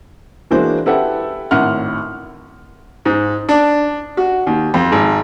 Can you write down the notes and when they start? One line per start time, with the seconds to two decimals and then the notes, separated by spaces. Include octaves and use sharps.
0.51 E3 G#3 A#3 D4 F#4 C5
0.86 E4 G4 A4 B4 E5 F#5
1.51 G#1 A2 F#5 F6
3.05 G#2
3.49 D4
4.17 F#4
4.47 D#2
4.74 F2
4.92 G#1